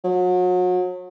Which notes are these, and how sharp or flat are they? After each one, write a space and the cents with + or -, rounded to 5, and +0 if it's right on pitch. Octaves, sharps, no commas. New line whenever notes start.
F#3 -35